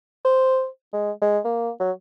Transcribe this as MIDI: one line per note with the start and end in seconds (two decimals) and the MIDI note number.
0.25 0.67 72
0.93 1.11 56
1.22 1.39 56
1.45 1.70 58
1.80 1.91 54